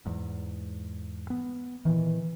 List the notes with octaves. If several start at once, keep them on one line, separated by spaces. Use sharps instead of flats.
E2 G#2
B3
A#2 D#3 E3